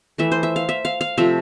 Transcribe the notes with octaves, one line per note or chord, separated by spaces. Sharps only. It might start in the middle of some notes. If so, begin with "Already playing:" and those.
E3 A3 E5
C5
E5
F5
E5
F5
F5
C3 F3 A3 E5